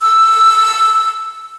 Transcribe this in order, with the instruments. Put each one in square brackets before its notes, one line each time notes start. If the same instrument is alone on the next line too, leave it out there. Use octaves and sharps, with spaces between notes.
[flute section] E6